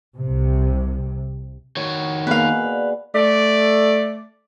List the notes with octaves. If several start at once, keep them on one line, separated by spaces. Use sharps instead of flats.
C2 C3
D#3 F#4 C#5
A#3 B3 D#4 G#4 B4 F5 D6
D5
A3 D5